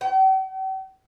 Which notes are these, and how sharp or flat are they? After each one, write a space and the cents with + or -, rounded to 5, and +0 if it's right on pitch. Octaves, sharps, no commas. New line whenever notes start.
G5 -45